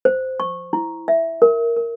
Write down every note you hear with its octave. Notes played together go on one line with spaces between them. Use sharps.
C5
C#6
E4
E5
A#4
A#4